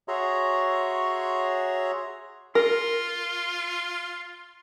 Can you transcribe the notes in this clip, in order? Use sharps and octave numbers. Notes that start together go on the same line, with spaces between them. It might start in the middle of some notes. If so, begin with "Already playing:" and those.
F#4 G#4 C#5 E5 A#5 C6
F4 A#4